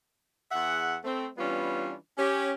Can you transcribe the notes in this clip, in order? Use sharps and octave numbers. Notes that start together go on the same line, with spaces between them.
E2 G#4 E5 F#5
A3 C4
E3 G3 B3 C#4 D4 F4
C#4 G4